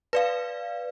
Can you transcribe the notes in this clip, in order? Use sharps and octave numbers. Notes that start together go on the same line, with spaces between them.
B4 D5 F5